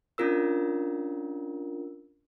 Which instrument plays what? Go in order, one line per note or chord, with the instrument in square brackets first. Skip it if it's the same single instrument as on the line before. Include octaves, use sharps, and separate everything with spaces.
[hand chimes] C#4 D4 F4 A#4 E6